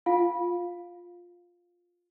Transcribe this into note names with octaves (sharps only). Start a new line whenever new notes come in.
F4 F5 G#5